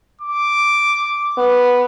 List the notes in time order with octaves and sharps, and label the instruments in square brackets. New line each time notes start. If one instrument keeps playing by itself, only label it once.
[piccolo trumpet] D6
[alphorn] B3